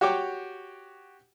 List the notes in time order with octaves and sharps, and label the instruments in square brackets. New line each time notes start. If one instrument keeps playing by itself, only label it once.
[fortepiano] F#4 G4 C#5 G5 D6